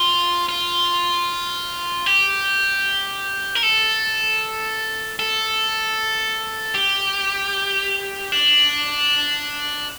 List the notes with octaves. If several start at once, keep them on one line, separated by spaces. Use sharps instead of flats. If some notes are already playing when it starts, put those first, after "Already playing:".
Already playing: F4
F4
G4
A#4
A4
A4
G4
D4